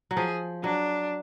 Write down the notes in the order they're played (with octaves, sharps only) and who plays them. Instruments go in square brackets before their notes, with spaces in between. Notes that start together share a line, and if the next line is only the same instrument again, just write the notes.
[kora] F#3
[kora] F3 [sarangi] G#4
[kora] F#3 [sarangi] D4